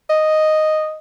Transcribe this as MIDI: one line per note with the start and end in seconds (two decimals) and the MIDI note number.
0.10 0.98 75